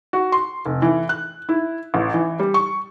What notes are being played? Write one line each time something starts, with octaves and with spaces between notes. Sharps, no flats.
F#4
C6
F1
E3
F#6
E4
A1
E3
G3
C#6